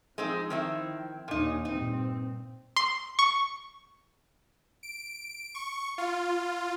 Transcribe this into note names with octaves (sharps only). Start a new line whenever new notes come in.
F3 G#3 C4 D#4
D#3 C4 E4
D#2 A#2 D#4
G2 A#2 C4 D#4
C6
C#6
D7
C#6
F4